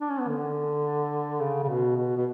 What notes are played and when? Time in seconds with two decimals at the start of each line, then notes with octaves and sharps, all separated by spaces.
0.01 D4
0.10 C#4
0.20 B3
0.28 D3
1.41 C#3
1.63 C#3
1.69 B2
1.97 B2
2.17 B2